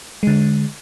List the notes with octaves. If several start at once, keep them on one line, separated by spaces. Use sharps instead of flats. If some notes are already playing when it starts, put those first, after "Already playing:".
D3 G#3